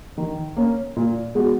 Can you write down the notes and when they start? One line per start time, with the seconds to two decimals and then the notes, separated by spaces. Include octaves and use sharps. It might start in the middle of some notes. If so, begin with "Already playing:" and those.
0.18 D#3
0.56 A#3 C#4
0.96 A#2
1.35 G#3 B3 F#4